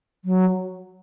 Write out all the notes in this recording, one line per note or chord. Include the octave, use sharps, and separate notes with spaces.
F#3